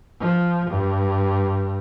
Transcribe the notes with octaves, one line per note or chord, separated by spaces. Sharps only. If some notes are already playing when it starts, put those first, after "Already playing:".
F3
G2